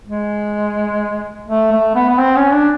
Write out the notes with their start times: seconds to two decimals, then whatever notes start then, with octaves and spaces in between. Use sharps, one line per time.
0.08 G#3
1.48 A3
1.72 A3
1.95 B3
2.09 B3
2.19 C4
2.36 C#4
2.53 D4